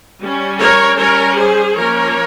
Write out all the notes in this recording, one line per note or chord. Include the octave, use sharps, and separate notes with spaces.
G3 C#4
A#4 C#5
G3 C#4 A#4 C#5
G#4 C5
F3 A#3 C#4 A#4 C#5